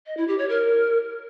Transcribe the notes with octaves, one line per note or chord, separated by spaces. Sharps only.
D#5
E4
G4
C#5
A#4